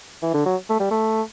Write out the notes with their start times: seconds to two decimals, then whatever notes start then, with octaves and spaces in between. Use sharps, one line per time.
0.22 E3
0.34 D3
0.46 F#3
0.69 A3
0.80 G3
0.91 A3